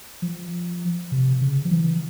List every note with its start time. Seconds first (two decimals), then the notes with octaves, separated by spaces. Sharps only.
0.22 F3
1.12 C3
1.41 C#3
1.65 F3
1.71 E3